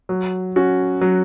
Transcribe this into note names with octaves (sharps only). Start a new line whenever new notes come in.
F#3
C#4 F#4
F#3